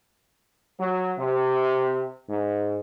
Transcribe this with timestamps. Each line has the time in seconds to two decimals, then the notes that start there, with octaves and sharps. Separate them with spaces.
0.79 F#3
1.18 C3
2.28 G#2